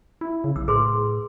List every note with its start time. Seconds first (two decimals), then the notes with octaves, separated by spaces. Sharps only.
0.21 E4
0.44 C#3
0.56 B1 E6
0.68 A2 G#4 B4 C6